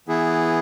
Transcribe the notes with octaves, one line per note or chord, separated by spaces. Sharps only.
E3 B3 E4 G#4